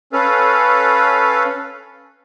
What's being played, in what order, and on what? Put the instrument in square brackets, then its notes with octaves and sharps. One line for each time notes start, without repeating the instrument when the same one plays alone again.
[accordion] C#4 A4 B4 F5